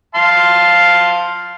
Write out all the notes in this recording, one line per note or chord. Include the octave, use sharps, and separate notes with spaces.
F5 A5 C6